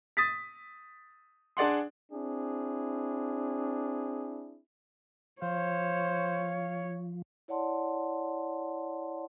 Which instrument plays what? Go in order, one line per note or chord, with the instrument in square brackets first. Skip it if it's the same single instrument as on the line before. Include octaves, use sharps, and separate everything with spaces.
[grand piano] D#6 A6 B6
D4 G#4 D5 F#5 C6
[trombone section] C4 D4 E4 G#4
[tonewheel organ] F3 [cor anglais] C5 [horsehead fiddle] C#5 [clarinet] F5
[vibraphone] E4 C#5 D5 F#5 A5 C6